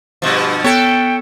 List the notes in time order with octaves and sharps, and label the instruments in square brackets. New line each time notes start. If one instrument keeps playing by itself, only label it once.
[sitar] G2 B2 F3
[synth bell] B3 [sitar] A4 C#5 [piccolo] G5